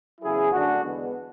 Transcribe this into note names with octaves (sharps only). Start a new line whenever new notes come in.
E2 C#3 F#3 E4 G#4
F#2 D3 A3 D4 F#4
E2 D3 G#3 B3